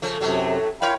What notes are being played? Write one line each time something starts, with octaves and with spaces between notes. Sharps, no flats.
C#3 F3 A3
F#2 A2 C3 F#3 A3
E4 A#4 C#5 F5 G5 B5